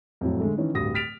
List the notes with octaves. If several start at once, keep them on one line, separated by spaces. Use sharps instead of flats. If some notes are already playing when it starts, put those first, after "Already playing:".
F2 A2 F#3
D3 G#3 A3
D#3 E3 C#4
D1 G2 F#4 D#6 A#6
F6 A6 B6 D7 F7